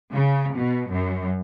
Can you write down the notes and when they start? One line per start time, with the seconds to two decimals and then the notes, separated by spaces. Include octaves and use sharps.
0.12 C#3
0.55 B2
0.91 F#2